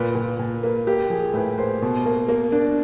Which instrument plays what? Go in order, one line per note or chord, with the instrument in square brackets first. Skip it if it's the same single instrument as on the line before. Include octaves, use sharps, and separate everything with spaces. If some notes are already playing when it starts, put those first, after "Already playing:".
Already playing: [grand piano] A#2 B4
A#2
A#2
A#3 B4
A#3 G4
F3 G#4
A2 B4
A#3 C5
B2
A#3
A#3
D4